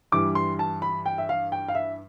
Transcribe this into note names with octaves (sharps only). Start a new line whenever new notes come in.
G2 E3 G3 D6
C6
A5
B5
G5
E5
F5
G5
F5
E5